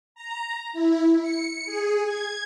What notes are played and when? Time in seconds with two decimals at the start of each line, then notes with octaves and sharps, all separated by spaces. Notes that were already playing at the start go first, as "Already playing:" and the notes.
0.15 A#5
0.73 E4
1.20 C#7
1.66 G#4
2.06 G#6